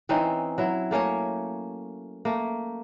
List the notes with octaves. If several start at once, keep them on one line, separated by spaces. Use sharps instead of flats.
E3 C4 C#4 D#4
F#3 E4
A3 A#3 C#4 C#5
A3 A#3